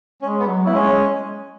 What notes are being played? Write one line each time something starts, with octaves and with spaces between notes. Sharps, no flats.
G#3 C#4
B3
F#3
B3 E4
G#3 C#4
G#3